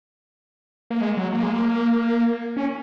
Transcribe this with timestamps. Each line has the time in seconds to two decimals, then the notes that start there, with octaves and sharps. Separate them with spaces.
0.90 A#3
1.01 G#3
1.17 F#3
1.32 A#3
1.43 G#3
1.53 A#3
2.57 C#4